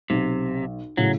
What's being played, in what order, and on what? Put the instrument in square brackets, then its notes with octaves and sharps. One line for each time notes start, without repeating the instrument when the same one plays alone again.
[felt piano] B1 [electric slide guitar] C3
[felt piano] A2 C#3 [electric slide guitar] F#3